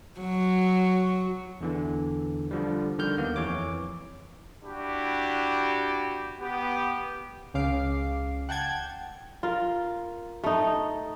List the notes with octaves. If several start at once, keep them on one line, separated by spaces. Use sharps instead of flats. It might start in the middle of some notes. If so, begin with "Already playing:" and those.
F#3
E2 D3 E3
D3 F3 G3
D3 D#3 G3 F6 G6
D#2 A#3 B3
F2 E3 C#5 D6
D4 E4 F#4 G4
B3 G4
C#2 C#3 F5 D6 C7
F#5 G5 A5 G#6
F4 A#4
A3 D#4